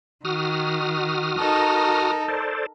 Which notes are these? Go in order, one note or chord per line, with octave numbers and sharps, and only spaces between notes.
D#3 F#4 D#6 F6
D#4 A4 A#4
A4 C5 D5